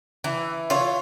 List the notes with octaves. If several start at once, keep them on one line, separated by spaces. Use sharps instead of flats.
E3
F4 C#5